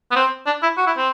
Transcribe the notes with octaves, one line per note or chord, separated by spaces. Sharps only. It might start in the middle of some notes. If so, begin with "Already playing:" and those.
B3
C4
D4
E4
F#4
E4
C4